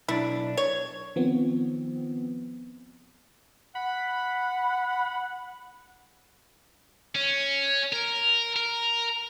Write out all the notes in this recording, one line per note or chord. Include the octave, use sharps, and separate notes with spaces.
B1 D4 E4
C#5
D#3 F3 B3 C4
F#5 B5
C#4
A#4
A#4